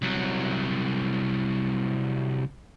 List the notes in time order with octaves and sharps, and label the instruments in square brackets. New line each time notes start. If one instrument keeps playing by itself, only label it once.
[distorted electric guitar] C2 F#3